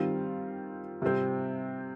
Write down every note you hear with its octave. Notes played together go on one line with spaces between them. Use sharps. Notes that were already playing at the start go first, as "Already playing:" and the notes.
Already playing: D#3 G3 C4 F4 F5
C3 G3 C4